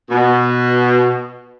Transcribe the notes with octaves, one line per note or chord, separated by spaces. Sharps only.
B2